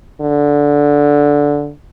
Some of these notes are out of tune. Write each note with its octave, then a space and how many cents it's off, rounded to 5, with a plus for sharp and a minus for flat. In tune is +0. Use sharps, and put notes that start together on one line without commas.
D3 -10